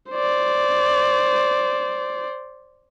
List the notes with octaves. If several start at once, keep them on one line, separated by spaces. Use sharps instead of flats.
C5 D5